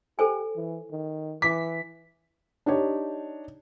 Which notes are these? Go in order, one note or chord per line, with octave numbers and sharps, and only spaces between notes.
G4 A4 C5 G#5
E3
D#3
E3 D6 B6
D4 D#4 G4 C#5